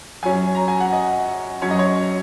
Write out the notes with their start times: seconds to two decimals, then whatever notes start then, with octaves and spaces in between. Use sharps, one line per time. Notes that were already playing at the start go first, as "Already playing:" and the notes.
0.23 F#2 F#3 C#4 G#5
0.55 A#5
0.68 G#5
0.80 F#5
0.93 D#5
1.62 F#2 F#3 C#4 C#5
1.71 D#5
1.79 C#5